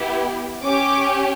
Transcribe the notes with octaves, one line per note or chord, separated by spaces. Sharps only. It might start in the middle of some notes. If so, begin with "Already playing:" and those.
Already playing: B3 E4 G4
C#4 G4 D6